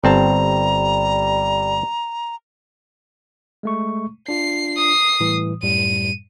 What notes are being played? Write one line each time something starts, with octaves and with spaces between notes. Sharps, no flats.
G1 G3 C4 A5 A#5
G#3 A3 C#6
D4 F4 C7
D#6 C7
A2 E3 G3
F#2 A2 G3 D#7